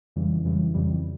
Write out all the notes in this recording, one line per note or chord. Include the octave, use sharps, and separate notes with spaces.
F2 C#3 E3 G3
F2 C#3 E3 G3
F2 C#3 E3 G3